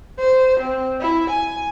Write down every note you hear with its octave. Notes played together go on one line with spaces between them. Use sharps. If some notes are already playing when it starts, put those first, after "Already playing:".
C5
C4
E4
G#5